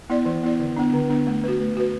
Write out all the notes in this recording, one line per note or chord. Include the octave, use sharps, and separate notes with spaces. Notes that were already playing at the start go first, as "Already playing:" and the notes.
B3 E4 D5
E3
B3 E4 D5
D3
B3 D4
D3
B3 D4
A3
F#4 B4
A3
F#4 B4